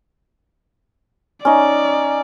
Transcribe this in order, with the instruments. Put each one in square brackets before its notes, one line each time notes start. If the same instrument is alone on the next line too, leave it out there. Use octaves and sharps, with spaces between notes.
[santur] C#4 D#4 [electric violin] D5